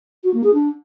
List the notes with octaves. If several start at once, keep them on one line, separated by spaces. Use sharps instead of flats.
F#4
A#3
G#4
D4